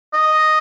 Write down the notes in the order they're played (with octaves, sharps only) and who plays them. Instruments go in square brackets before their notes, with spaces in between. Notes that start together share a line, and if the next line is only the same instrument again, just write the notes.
[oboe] D#5